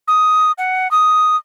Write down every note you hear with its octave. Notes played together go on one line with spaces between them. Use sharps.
D#6
F#5
D#6